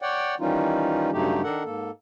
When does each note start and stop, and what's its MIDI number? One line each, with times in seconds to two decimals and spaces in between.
0.02 0.35 73
0.02 0.35 74
0.02 0.35 78
0.02 0.35 79
0.40 1.10 51
0.40 1.10 52
0.40 1.10 55
0.40 1.10 61
0.40 1.10 63
0.40 1.10 65
1.12 1.42 43
1.12 1.42 49
1.12 1.42 54
1.12 1.42 57
1.12 1.42 63
1.12 1.42 67
1.43 1.63 51
1.43 1.63 62
1.43 1.63 69
1.43 1.63 70
1.43 1.63 78
1.65 1.91 44
1.65 1.91 58
1.65 1.91 69